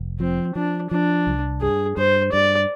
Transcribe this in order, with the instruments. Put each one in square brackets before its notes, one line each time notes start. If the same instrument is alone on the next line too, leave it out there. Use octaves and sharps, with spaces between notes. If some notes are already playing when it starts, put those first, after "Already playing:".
Already playing: [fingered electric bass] F1
[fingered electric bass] F3 [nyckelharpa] C4
[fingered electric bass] F3 [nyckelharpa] D4
[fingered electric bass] F3 [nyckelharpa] D4
[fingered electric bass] C2
[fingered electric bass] G2 [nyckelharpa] G#4
[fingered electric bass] G2 [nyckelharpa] C5
[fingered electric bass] G2 [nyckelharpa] D5